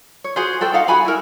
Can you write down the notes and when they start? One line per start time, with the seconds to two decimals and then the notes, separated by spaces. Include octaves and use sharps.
0.24 C#5
0.36 F#4 G#4 C5
0.61 F#4 A4 C5 G5
0.73 D#4 F5 F#5
0.88 F#4 G#4 G#5 B5
1.05 E4 A#4